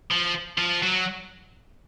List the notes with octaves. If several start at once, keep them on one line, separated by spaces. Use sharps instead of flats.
F3
F3
F#3